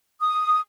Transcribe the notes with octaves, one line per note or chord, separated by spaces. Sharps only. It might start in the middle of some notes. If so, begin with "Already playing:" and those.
D#6